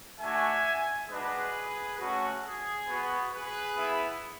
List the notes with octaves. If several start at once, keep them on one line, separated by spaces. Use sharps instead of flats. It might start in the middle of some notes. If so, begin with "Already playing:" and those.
A3 D4 F#4 E5 G#5
G#3 D4 F#4 G#4 B4
A3 C#4 F#4
G#4
B3 F#4
G#4 B4
B3 E4